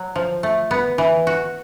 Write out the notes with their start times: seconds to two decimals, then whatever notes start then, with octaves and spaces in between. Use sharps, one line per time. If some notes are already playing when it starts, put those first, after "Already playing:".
Already playing: F#3
0.16 F3
0.43 A3
0.71 B3
0.98 E3
1.27 F#4